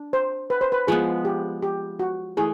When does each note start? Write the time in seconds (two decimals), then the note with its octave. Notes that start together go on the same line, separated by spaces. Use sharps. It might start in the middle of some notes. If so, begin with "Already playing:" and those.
Already playing: D4
0.13 C5
0.50 B4
0.61 C5
0.72 B4
0.87 F3 G#3 B3 G#4
1.25 G4
1.63 G4
2.00 F#4
2.37 E3 A3 G#4